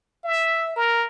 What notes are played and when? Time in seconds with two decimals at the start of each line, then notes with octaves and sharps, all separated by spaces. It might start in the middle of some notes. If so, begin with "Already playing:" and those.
0.24 E5
0.76 A#4